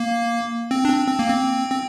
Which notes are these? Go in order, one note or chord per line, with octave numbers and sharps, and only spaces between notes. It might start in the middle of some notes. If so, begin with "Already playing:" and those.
Already playing: A#3
C4
D4
C4
C4
A#3
C4
C4